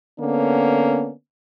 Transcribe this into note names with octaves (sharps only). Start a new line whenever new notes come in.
D3 A#3 B3 C#4